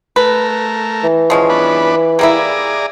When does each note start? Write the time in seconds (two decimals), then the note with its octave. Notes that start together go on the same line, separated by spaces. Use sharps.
0.16 A3 A#4 B4
1.04 E3
1.30 F3 G#3 C#4
1.50 B3 D4 B4
2.19 G3 A#3 E4 G#4 D5 A#5